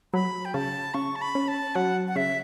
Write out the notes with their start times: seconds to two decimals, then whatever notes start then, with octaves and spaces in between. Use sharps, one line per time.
0.14 F#3 B5
0.45 G5
0.54 C#3 A5
0.94 C#3 C#6
1.16 A5
1.21 B5
1.35 C#4
1.48 A5
1.75 F#3 F#5
2.08 F#5
2.16 C#3 E5